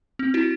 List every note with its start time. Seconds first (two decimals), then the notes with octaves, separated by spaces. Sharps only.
0.19 C4
0.34 E4 F#4